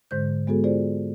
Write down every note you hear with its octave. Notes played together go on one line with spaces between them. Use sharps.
G#2 D3 G#3 C5 G6
G#3 B3 F#4 G#4 A4
F4 G#4 C5 D5